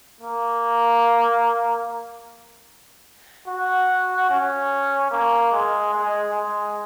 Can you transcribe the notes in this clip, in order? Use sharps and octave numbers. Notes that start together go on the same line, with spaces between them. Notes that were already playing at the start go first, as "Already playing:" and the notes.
A#3
F#4
C#4
A#3
G#3
G#3
G#3